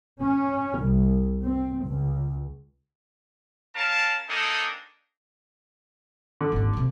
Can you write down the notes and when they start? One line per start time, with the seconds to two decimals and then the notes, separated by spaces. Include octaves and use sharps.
0.22 C#4
0.80 C2
1.43 C4
1.86 C#2
3.75 C#4 A#4 F5 A5
4.28 A#3 C4 D4 D#4 G#4 A4
6.41 D3
6.52 G#1 D#2
6.73 D2 C3